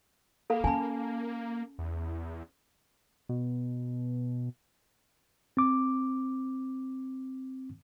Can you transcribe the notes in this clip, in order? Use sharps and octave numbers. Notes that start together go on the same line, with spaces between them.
A#3 A4 F5 B5
C#4 G#5 A5 B5
E2
B2
C4 D6